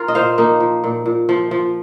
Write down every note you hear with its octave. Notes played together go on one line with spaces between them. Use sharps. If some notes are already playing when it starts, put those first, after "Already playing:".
Already playing: F4 A#4
D#5
A#2 C5 F5
F3 A#3 D#4
F3
A#2
A#2
F3
F3